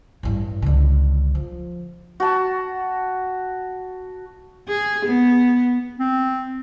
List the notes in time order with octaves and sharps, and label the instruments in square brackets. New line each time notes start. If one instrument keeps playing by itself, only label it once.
[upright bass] A1 G2
C#2 D3
F3
[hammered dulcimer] F#4 A5
[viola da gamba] G#4
B3
[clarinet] C4